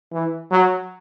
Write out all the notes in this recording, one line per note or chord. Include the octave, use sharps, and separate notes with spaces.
E3
F#3